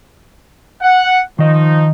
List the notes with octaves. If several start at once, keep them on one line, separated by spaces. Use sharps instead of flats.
F#5
D#3 F3 D#4 D#5